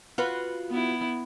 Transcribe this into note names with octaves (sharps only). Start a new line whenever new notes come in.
F4 F#4 B4
B3 E4